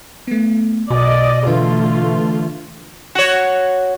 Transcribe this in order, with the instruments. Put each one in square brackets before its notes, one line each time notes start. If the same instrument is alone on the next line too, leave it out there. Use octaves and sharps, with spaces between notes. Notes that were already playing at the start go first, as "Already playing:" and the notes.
[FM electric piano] A3 B3
[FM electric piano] B1 F#4 [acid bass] B2 [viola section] D5 D#5
[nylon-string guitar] D3 E3 [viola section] A3 F4 [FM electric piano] B4
[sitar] F#4 C#5